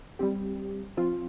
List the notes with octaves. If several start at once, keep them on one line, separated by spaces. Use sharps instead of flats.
G3 C4 G4
F3 C4 F4